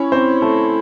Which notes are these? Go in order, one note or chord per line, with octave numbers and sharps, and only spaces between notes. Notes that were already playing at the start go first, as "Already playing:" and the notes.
Already playing: C#4 E4 C#5
C4 C5
A3 A4